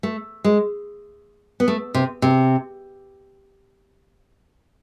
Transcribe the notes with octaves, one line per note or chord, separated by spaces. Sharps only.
A3
G#3
B3
A3
C3
C3